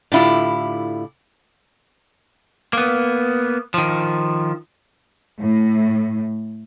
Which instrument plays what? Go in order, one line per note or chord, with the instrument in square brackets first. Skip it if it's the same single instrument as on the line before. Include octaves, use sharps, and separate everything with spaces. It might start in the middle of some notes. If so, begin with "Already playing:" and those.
[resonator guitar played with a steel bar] A2 D3 E4 F4 G4
[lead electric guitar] A#3 B3
D#3 F3
[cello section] A2